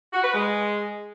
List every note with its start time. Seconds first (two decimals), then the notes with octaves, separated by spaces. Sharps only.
0.13 F#4
0.23 B4
0.34 G#3